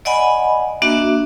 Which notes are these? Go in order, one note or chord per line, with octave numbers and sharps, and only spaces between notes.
D5 D#5 F#5 G#5 B5
A#3 D4 F#4 E5